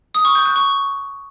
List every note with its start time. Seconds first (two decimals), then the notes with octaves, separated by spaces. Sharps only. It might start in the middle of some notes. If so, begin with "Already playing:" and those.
0.15 D#6
0.25 C#6
0.35 G6
0.45 F#6
0.56 C#6